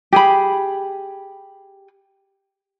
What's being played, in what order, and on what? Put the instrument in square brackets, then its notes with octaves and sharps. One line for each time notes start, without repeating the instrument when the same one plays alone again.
[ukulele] G4 G#4 B5